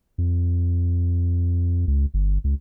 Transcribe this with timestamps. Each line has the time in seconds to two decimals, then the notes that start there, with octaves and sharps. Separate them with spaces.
0.18 F2
1.87 C#2
2.14 G1
2.44 C#2